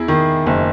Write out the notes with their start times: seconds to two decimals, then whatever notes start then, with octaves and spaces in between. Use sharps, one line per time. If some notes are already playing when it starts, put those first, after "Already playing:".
Already playing: E2 E4 G#4
0.08 D#3
0.47 F#1